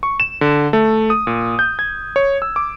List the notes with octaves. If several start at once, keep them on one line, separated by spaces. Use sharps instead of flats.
C#6
E7
D3
A3
D#6
A#2
G6
G#6
C#5
E6
D6